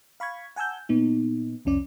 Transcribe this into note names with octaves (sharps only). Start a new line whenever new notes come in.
F5 B5 C#6 G#6
F#5 G#5 A5 E6 G6
A#2 B3 D#4
C2 F2 C#4 D5